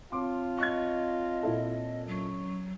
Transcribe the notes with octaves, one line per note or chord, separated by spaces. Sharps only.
C4 F4 C#5 A5 C6 D6
D#5 C#6 F#6 G#6
A#2 E4 A4
F#3 C#4 C#6